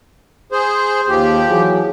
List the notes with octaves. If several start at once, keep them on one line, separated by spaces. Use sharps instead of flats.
G#4 C5
D#2 F3 G4
E3 F#3 G#4